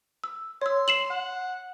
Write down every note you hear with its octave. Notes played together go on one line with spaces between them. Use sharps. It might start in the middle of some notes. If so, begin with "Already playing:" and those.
E6
C#5 C6 E6
C7 E7 F#7
F#5